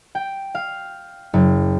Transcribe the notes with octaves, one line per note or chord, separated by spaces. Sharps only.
G5
F5
F#1